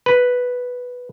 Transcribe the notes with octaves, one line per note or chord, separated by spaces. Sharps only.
B4